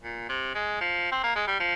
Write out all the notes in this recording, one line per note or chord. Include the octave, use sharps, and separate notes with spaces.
A#2
C3
G#3
F3
C4
A#3
G#3
G3
F3